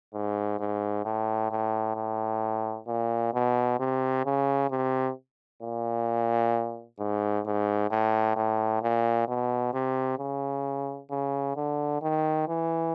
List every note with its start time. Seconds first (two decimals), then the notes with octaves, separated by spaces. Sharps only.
0.14 G#2
0.59 G#2
1.05 A2
1.51 A2
1.96 A2
2.88 A#2
3.34 B2
3.79 C3
4.25 C#3
4.70 C3
5.63 A#2
6.99 G#2
7.46 G#2
7.91 A2
8.36 A2
8.82 A#2
9.28 B2
9.73 C3
10.19 C#3
11.11 C#3
11.56 D3
12.02 D#3
12.48 E3